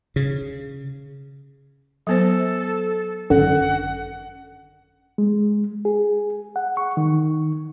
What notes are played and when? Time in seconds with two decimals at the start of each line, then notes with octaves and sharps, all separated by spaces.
0.16 C#3
2.07 F#3 B3 A4 C5
3.30 G#1 F#2 D3 F#5
5.18 G#3
5.85 G#4
6.56 F#5
6.77 C#6
6.97 D#3